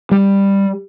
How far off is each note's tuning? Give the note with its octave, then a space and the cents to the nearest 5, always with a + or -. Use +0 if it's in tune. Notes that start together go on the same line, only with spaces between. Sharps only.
G3 +10